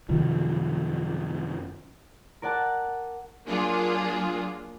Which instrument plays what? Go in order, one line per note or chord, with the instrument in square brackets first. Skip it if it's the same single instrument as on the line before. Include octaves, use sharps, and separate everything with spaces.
[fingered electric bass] F#2 C3 D#3 F3
[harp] A#4 D5 F#5 A5
[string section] F#3 A#3 D4 F4 G#4